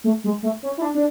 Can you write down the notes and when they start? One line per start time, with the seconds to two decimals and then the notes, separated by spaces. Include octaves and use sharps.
0.04 A3
0.24 G#3
0.43 A3
0.63 C#4
0.77 E4
0.82 D4
0.95 D4